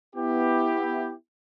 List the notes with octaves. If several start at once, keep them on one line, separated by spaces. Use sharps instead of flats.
B3 E4 G4